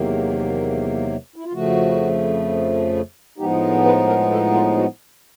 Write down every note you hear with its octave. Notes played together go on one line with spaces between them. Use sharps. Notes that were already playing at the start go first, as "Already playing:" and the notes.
Already playing: E2 C3 D#3 F#3 A#3
E4
F4
F2 C#3 F3 A3 F#4
A2 F3 G#3 B3 D#4 G4
B4
A#4
A4
F4
F#4